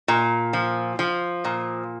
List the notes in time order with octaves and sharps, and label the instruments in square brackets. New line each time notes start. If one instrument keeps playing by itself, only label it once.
[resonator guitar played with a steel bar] A#2
F3
F3
A#2